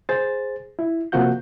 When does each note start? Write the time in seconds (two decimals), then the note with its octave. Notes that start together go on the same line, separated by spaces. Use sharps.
0.09 G#4 C5 A6
0.79 E4
1.12 C3 F3 A#3 F#4 F#5 G6